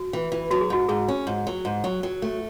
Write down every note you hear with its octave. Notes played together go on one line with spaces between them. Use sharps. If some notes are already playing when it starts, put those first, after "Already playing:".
Already playing: F#4
E3
E3
F#3 F#4
G#4
G#2 F#4
G#2 G#4
C#4
G#2
F#3
G#2
F#3
F#3
A3